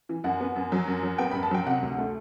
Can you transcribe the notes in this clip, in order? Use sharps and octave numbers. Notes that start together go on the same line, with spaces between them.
E3
F#2 F#5
B3
F#2
F#3
F#2
F#3
B3 G5
B5
F#2
A5
F#3 G5
C3 F#5
D2
A3